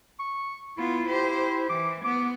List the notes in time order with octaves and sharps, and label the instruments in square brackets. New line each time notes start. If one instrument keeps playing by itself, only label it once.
[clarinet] C#6
[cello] B3 F4 [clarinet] E4
[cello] G4 C5
[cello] E3 [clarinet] D6
[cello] B3 [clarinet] D6